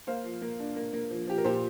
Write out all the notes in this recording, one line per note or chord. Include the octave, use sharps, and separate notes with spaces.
A#3 C5 F5
F3
A#3
D4
A#3
A#3
F3
F3 G4
A#4
A#2 G4 C5